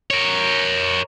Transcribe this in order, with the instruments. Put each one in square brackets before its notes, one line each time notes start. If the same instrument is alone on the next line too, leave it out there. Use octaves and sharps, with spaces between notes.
[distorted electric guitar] A#4 C#5